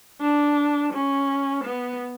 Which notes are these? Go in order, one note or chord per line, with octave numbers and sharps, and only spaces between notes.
D4
C#4
B3